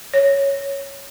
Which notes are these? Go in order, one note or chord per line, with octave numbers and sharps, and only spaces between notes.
C#5